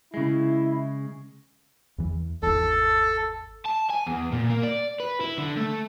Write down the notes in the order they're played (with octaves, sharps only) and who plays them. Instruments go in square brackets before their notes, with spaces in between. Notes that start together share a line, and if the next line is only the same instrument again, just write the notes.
[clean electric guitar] C#3 G#3 [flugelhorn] E4
[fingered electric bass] E2 E3
[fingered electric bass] G#1 E2 [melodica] A4
[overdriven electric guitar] A5
G#5
E2
A#2
A#3
D5
B4
E4
D3
A3